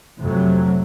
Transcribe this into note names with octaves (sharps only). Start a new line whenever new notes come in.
F2 C3 F#3 A3